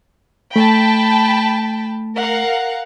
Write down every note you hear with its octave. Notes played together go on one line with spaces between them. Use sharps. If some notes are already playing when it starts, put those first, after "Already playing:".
A3 G5 A5 B5
A#4 F5 F#5